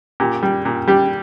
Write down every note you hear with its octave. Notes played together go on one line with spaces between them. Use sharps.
A#2 G4
G3
A#2
G3 G4